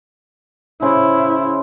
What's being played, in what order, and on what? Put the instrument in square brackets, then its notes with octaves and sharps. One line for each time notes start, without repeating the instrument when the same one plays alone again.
[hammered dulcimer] C#3 C5 B5 [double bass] E4